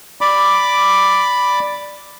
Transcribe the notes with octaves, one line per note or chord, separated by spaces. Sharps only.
D5 B5 D6